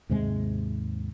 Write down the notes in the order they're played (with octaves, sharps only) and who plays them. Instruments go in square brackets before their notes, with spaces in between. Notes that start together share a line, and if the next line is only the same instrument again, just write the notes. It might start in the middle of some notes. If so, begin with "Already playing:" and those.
[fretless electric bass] D#2 G#2 C3 G#3